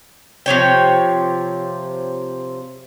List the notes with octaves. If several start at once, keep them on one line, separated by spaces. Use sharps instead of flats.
C3 F3 C#5 G5